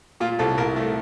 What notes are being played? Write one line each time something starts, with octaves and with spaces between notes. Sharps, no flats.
A#2 F4
C2 A4
C2 A#4
A3